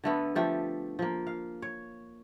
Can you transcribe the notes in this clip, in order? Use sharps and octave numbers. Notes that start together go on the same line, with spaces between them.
D3 A3 B3
F3 A3 G4
F3 A#3
F5
C#5